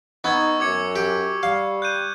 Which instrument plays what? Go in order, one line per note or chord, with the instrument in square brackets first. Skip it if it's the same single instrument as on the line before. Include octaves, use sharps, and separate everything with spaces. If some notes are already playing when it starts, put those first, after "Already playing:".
[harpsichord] B3 [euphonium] D#4 [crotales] C#6 E6 G#6
[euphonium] F#2 [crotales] D6 G#6 C#7
[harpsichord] G4
[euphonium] G3 [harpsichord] F5
[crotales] F#6 G6 D#7